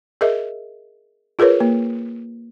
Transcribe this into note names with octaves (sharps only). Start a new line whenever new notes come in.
G#4 A#4 D#5 E5
F4 G#4 A#4 B4 C#5
A#3